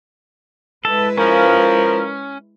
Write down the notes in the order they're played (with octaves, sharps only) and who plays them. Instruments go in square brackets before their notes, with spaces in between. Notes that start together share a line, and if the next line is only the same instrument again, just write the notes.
[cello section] G#3 E4 B4 [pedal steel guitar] A4
[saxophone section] F3 [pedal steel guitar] C#4 [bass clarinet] A#4